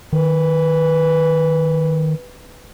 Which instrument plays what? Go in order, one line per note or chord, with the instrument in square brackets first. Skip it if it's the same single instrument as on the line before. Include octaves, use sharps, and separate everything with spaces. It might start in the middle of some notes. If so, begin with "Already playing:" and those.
[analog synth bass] D#3 [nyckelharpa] B4